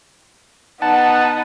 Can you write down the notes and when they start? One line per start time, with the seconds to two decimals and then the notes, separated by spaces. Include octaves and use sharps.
0.82 B3 D#4 F#5 A5